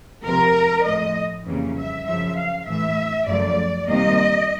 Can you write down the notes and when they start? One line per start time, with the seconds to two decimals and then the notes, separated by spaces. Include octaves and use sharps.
0.24 F2 C3 F3 A#4
0.85 A2 F3 A3 D#5
1.45 F2 C#3 E3 G3 A#3
1.76 E5
2.06 F#2 C#3 F3 E5
2.36 F5
2.66 A2 E3 A3 E5
3.27 F#2 C#3 F3 A3 D5
3.87 C3 D#3 G3 A#3 D#5